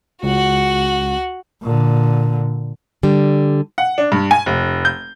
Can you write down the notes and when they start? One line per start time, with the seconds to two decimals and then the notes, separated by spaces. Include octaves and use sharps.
0.23 C#2 F#4 F#5
1.62 A#2 D3
3.03 D3 G3
3.78 F#5
3.98 D4
4.12 G2
4.31 G#5
4.46 F1
4.85 G6